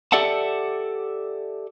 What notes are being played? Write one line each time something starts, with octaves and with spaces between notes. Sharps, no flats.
G4 A4 D5 E5 F#5 A5